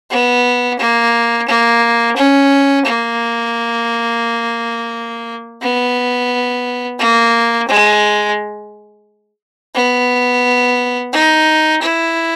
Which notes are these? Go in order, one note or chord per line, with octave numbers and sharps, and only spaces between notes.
B3
A#3
A#3
C#4
A#3
B3
A#3
G#3
B3
D#4
E4